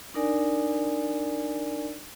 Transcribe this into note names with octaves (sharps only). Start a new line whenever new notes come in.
D4 D#4 A#4 D5 G#5